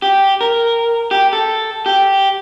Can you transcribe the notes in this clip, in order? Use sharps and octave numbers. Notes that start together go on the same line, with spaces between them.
G4
A#4
G4
A4
G4